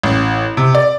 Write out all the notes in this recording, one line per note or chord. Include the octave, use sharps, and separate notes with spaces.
A1
C3
D5